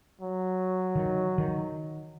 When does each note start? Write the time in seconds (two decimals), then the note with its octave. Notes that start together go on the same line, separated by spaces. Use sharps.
0.21 F#3
0.95 D#3
1.38 D#3